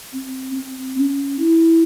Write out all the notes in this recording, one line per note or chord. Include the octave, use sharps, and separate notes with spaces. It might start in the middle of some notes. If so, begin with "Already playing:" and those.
C4
C4
C#4
E4